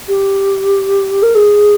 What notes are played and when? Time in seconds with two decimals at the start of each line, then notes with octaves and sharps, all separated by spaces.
0.09 G4
1.22 A#4
1.35 G#4